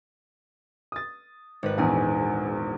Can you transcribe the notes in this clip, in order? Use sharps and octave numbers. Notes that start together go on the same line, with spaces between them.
D#6 A6
G#1 B4
A#1 E2 G#4